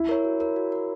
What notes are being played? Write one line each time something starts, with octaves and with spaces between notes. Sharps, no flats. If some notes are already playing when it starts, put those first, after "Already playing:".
Already playing: E4
A#4 C#5
F#4
A#4 C#5
F#4
A#4 C#5